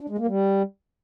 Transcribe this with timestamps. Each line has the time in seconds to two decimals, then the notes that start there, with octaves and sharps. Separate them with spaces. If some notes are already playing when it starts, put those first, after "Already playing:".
0.01 D4
0.09 G#3
0.18 A#3
0.27 G3